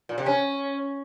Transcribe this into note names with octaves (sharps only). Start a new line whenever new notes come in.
A#2
C3
C#4